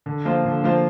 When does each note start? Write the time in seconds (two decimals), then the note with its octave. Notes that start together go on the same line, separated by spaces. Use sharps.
0.06 D3
0.25 F3 A#3 F4 C5
0.45 D3
0.64 F3 A#3 F4 C5